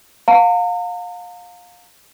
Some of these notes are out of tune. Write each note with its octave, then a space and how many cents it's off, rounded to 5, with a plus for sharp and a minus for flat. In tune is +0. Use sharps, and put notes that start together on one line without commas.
F5 +25 A#5 -40